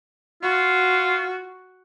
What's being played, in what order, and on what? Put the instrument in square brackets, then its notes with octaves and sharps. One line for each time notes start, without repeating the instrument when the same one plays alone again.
[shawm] F4 [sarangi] F#4